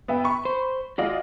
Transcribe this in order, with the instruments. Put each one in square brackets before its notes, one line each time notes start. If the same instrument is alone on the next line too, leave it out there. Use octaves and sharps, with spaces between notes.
[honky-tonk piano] B3 E5 G5
B5 C#6
[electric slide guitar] C5
[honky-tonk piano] G#3 F4 D#5 [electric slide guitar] F#4 D5